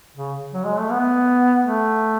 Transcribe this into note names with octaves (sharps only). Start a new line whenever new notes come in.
C#3
F#3
G#3
A3
B3
A3